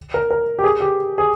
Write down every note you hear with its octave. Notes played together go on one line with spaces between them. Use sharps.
A#4
A#4
G4
G#4
G4
G#4